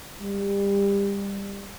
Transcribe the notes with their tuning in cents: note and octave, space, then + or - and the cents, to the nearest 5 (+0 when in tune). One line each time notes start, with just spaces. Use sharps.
G3 +25